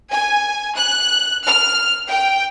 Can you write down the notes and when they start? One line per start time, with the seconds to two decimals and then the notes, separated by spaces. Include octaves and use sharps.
0.11 G#5
0.76 F#6
1.45 F6
2.10 G5